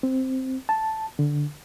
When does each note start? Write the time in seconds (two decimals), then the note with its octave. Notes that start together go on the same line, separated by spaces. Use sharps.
0.03 C4
0.69 A5
1.19 D3